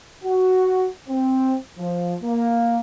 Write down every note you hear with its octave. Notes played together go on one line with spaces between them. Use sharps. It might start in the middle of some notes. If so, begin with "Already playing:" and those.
F#4
C4
F3
A#3